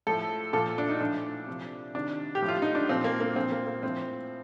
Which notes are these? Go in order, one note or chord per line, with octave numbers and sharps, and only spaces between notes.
A2 F3 A4
A#2 F3 A4
D4
D#4
A2 F3 D4
C3 F3
C3 D#3 D4
G4
A2 F3
F4
D#4
D4
A#2 F3 C4
A#3
A#3
A#2 F3 C4
A#3
A#3
A2 F3 C4